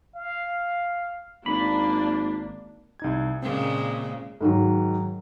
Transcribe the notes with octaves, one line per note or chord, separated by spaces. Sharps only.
F5
G#1 A#3 D4 B5
C2 D#4 G#6
A#2 C#3 G#3 A#3 C4
G#2 D#3 F#3